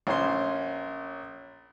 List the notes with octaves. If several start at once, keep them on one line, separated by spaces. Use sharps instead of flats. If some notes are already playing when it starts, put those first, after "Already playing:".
A#1 C#4 C5 C6